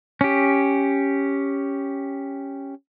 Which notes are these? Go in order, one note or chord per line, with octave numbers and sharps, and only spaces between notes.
C#4 G4